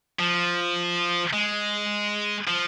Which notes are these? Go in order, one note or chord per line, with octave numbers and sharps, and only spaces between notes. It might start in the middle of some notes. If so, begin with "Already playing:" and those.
F3
G#3
F3